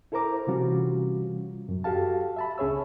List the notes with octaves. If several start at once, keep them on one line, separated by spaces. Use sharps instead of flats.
E4 A4 A#4 C5 A#5 D6
C3 E3 G3 C#4 F4 F#4
F#2
F#4 G4 A4 F5 A5
E5 A5 B5
C#2 C#4 G#4 C#5 E6